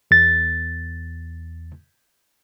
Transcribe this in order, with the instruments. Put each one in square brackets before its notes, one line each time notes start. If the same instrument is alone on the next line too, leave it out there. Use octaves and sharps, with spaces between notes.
[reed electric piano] E2 A6